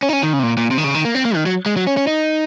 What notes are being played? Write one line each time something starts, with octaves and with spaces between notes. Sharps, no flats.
C#4
D#4
C#4
D#3
C#3
C3
A#2
A#2
C3
D#3
C#3
D#3
A#3
C4
A#3
D#3
F#3
G#3
F#3
C#4
C#4
D#4